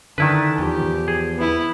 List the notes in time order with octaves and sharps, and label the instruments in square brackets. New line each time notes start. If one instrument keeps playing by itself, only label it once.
[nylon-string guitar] D3 D4 [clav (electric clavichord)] D#3 E4 B4 [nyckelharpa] A5
[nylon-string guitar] E2 F3 [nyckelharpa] G4
[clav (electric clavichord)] G#4
[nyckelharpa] B3 E4